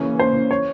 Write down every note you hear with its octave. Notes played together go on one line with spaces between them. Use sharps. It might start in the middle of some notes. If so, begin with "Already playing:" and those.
Already playing: C#3 E3 A#3 C#4
C5
C#5